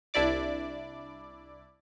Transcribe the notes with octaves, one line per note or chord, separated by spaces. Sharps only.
C2 D4 E4 D5 D6